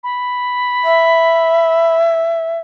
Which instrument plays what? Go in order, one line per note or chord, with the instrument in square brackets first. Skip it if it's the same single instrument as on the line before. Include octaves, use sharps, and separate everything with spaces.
[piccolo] B5
[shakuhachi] E5